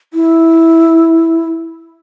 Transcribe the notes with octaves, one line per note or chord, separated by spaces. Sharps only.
E4